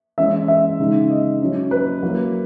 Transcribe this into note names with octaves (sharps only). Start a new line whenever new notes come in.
E3 G#3 C#4 E4 E5
E5
C#3 G#3 D#4
D#5
F#3 C#4 E4
B4
F#3 A#3 E4